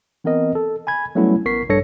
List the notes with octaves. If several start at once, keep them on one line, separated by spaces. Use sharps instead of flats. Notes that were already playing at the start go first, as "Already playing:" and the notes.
E3 B3 C4 A#4 D#5
A4
G#5 B5 G#6
F#3 G3 A3 B3 C#4 E4
A1 B3 A#4 C#6 B6 C7
A#1 G2 A4 C#5 A#6 C#7